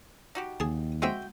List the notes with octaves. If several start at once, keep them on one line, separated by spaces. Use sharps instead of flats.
D#4 F#4 G4
D#2 G#4 A5
G#3 C4 F#4 E5 G5